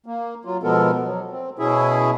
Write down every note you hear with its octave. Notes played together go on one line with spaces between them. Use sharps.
A#3
F#3 F4
B2 F3 G#3 B3 A4 A#4
F#3
C4
B2 C#4 E4 G#4 E5